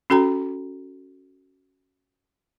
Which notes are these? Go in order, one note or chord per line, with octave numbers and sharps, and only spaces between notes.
C#4 F#4 A4 G5 A#5